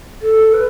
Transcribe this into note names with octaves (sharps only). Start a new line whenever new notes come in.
A4
B4